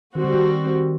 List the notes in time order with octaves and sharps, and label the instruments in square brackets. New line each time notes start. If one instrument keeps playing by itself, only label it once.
[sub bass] D#3 [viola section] G3 C4 F#4
[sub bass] D3
D#3